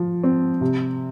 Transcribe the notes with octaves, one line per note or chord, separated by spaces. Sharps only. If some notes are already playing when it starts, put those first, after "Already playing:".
Already playing: F3
C4
C3